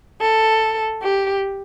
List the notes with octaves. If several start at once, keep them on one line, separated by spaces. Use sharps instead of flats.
A4
G4